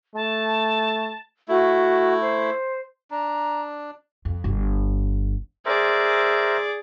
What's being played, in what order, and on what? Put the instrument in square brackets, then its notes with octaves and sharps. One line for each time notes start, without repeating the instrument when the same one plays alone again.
[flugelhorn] A3 [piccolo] A5
[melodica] A3 E4 [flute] F#4
[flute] C5
[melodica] D4 [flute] A#5
[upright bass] F2
G1
[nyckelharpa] G#4 D5 [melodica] A#4 C5 E5